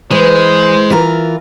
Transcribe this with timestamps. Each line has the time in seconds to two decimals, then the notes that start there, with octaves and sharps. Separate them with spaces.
0.11 E3 G#3 C5
0.90 E3 F4 A#4